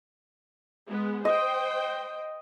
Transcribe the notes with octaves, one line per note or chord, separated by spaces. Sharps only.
G#3 B3
C5 D#5 G5